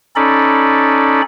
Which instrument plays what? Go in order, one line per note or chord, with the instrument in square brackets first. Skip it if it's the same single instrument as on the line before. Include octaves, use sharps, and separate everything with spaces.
[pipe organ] C#4 D#4 A4 D5 B5